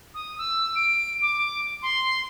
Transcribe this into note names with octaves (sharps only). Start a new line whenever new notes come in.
D#6
E6
D7
D6
C6